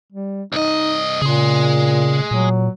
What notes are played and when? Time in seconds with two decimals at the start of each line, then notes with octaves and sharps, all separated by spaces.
0.13 G3
0.53 C2 D#4 D#5
1.22 A#2 C#3 G#4 C6
2.31 A#2 F#3